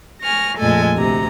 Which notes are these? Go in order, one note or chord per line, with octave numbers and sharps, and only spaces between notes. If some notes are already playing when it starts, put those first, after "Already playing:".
G#5 C#6 F6 A#6
F2 A#2 G#3 A3 A4 G#5
D2 C3 A#5